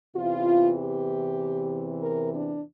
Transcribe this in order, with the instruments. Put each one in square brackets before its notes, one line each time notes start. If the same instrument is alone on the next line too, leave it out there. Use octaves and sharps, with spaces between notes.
[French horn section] E2 C3 E3 F4
G4
A#4
D4